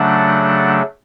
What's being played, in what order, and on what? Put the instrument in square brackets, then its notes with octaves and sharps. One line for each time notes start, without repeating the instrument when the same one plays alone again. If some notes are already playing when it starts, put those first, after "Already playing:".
Already playing: [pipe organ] C#3 F#3 A3 D4 F#5